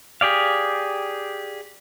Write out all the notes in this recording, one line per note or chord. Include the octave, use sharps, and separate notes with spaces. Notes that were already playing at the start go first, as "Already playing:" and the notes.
G4 G#4 D5 F5